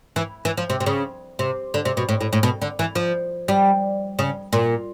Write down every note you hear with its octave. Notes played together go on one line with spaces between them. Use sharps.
E3
E3
F3
C3
C3
C#3
C3
D3
C3
B2
A2
A2
A2
B2
D3
E3
F3
G3
C#3
A#2